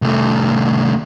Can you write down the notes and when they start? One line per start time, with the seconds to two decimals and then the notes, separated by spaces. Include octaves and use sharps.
0.02 C2 A3